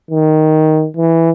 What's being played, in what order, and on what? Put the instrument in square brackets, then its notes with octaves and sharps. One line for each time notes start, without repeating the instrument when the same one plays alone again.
[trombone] D#3
E3